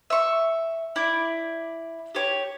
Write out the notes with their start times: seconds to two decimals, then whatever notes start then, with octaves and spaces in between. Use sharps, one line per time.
0.10 E5 C#6
0.96 E4 D5
2.15 G4 C#5